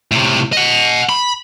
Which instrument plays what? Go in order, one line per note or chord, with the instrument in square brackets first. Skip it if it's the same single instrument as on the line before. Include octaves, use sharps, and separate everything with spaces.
[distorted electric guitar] A2 C3
D#5 F#5
B5